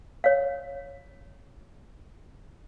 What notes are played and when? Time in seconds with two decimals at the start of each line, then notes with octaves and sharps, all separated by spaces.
0.24 C#5 F5